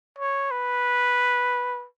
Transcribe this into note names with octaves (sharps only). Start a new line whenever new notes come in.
C#5
B4